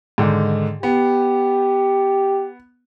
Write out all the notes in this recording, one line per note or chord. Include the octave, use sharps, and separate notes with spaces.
G#2 D3 D#3
B3 G4